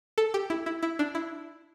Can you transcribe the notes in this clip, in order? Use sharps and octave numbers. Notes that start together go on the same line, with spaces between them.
A4
G4
E4
E4
E4
D4
E4